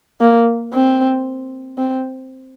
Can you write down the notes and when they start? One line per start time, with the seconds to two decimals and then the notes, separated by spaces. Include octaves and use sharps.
0.21 A#3
0.73 C4
1.78 C4